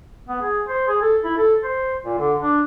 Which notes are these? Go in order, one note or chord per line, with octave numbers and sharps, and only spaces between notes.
B3
G#4
C5
G#4
A4
E4
A4
C5
A#2
D3
D4